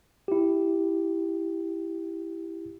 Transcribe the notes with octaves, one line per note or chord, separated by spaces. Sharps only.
E4 G4